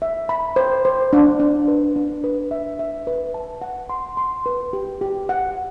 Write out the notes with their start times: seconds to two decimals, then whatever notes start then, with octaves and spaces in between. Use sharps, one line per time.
0.02 E5
0.29 B5
0.56 C5
0.85 C5
1.13 D4
1.40 D4
1.68 B4
1.96 D4
2.24 B4
2.51 E5
2.79 E5
3.07 B4
3.34 A5
3.62 F#5
3.90 C6
4.17 C6
4.46 B4
4.73 G4
5.01 G4
5.29 F#5